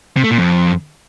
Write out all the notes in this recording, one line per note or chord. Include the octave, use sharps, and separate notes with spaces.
C3
A3
A#2
F2